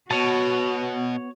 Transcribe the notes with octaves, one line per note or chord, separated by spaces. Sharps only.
B2 B3 F#4 C#5 A5